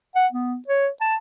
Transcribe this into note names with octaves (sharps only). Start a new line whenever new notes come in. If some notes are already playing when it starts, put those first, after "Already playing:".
F#5
B3
C#5
A5